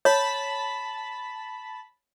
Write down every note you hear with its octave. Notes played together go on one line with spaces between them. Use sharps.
C#5 A5 B5